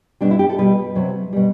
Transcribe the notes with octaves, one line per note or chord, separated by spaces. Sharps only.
B2 G3 D4
E4
G4
A4
B2 G3 B4
C3 F#3
B2 G3